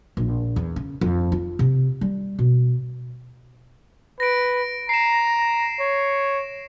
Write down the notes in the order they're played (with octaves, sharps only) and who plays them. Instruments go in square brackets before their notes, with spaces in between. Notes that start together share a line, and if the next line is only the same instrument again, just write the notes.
[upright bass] A#1
E2
C#3
F2
F4
C3
G3
B2
[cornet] B4 [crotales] A#6 D7
[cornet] A#5 [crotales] C7 E7
[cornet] C#5